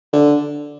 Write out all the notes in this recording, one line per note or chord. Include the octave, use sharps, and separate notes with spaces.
D3